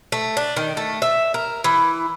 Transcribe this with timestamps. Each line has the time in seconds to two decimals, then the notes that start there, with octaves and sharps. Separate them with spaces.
0.12 A3
0.37 D4
0.57 D#3
0.77 A3
1.02 E5
1.34 A#4
1.64 E3